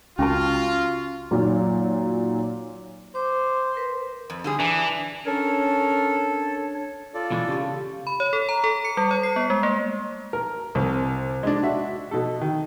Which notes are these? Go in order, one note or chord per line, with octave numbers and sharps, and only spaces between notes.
C#2 C#4 F4 F#4 A5
F#2 A#2 D#3 F#3
C5 D6
A#4 B4
F2
D3 G3 G#4
E3 D4
C#4 D4 A4 A#4 C#5
F4 A4 D5
B2 E3 G#3
C#3 G4 F5
B5
C#5
A4
A#5
A4
C#7
G3
C#5
C7
B3
G#3
A#3
A#4
C2
G#3 D4
F#4 E5
B2 A4
D#3